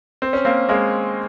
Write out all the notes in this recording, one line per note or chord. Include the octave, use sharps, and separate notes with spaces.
C4
C#4
A#3 C4
G#3 A#3